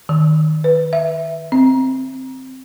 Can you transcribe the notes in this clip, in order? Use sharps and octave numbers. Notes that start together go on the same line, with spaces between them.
D#3
B4
E5
C4